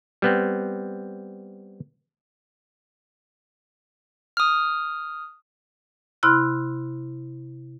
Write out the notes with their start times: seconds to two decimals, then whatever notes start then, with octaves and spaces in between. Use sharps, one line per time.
0.22 G3 B3 C4
4.37 D#6 F6
6.23 C3 E4 B5 C6 F6 F#6